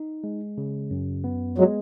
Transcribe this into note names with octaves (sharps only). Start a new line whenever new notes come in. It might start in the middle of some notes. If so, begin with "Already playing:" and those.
Already playing: D#4
G#3
C#3
F#2
B3
F#3 G#3